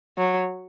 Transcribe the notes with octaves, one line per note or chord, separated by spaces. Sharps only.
F#3